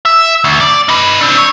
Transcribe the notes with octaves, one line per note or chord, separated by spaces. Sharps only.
E5
D2
D5
D#4 B4
C4 D4
C#5